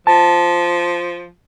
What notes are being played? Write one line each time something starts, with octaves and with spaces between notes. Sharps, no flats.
F3 A5